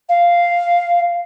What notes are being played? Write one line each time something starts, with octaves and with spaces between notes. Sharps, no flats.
F5